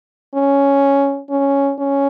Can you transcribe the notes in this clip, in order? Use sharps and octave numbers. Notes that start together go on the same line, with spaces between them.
C#4
C#4
C#4